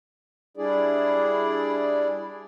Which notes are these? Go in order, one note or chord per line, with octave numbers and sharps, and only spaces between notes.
G3 D4 E4 G#4 D5